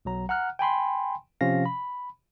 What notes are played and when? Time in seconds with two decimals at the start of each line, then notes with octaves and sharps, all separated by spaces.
0.05 B1 F#3 A#5
0.29 F#5 A#5 F6 F#6
0.59 G5 G#5 B5 C6
1.41 C3 F3 C#4 F5 A#6
1.65 B5